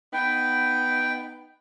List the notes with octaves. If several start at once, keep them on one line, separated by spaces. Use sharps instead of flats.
B3 D#4 G5